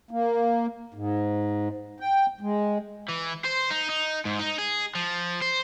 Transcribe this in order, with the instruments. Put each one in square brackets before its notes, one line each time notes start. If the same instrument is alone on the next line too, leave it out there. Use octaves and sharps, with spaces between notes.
[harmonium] A#3
G#2
G5
G#3
[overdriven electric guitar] E3
C5
D#4
D#4
G#2
D#4
G#4
F3
C5